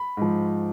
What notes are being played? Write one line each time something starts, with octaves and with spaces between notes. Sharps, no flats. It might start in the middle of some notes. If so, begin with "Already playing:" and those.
Already playing: B5
G#2 F3